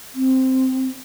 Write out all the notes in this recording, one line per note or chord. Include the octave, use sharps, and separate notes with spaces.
C4